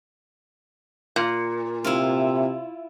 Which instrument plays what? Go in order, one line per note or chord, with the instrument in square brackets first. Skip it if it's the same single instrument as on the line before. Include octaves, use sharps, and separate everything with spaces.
[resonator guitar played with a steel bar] A#2
[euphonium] C3 [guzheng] E4 F4